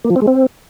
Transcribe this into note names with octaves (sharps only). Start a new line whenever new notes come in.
A#3
F3
C4
G#3
C4